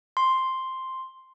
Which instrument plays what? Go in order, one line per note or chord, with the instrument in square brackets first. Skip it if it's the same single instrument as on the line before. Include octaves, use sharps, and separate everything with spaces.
[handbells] C6